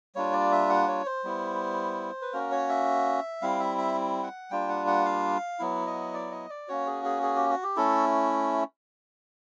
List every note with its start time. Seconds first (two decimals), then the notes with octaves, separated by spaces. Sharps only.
0.15 G3 A#3 D4 F4 C#5
0.33 D5
0.52 E5
0.69 F#5
0.88 C#5
1.06 C5
1.24 G3 B3 E4
2.22 B4
2.33 A#3 C#4 F#4 A#4
2.51 C#5
2.69 E5
3.42 G3 C4 E4 F5
3.60 E5
3.78 E5
4.23 F#5
4.51 G3 A#3 D4 F4 G5
4.69 F#5
4.87 F#5
5.05 F5
5.59 F#3 B3 E4
5.87 D#5
6.14 D5
6.32 D#5
6.50 D5
6.68 A#3 C#4 F#4 C#5
6.86 G#4
7.05 G#4
7.23 G#4
7.36 G4
7.50 F#4
7.63 G4
7.76 A3 C#4 E4 A4